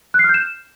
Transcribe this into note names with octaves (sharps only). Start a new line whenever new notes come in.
F#6
C7
F6
G6
E7